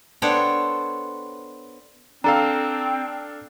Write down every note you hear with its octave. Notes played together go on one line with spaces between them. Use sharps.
B3 D4 A4 C5 C#5 G5
C4 D4 A4 F5 A#5